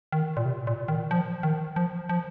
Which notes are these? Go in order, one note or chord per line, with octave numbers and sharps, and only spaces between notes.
D#3
A#2
C3
A#2
D#3
F3
D#3
F3
F3